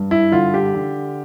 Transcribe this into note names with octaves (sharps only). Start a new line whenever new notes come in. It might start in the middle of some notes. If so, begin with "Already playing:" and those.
Already playing: G2
E4
D3 F4
G4
D3